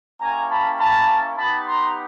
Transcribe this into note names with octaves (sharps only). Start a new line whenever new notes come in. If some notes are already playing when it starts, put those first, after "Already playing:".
A#3 C#4 E4 G4 G#5 A#5
A5 B5
A5 B5
B3 D#4 G4 A5 B5
A#5 C6